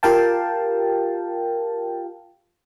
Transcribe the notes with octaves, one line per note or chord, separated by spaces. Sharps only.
F4 G4 A#4 F5 G5 A5